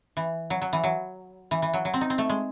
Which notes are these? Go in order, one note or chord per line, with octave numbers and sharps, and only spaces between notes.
E3
F#3
F#3
E3
F#3
E3
E3
F#3
F#3
C4
D#4
C4
A3
G#3